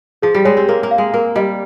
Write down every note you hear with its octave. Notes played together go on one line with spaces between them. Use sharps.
F3 G#4
G3
G#3 C#5
C4
A#3 A#4
A#3
F5
G#3
A#3 A#4
G3 D#5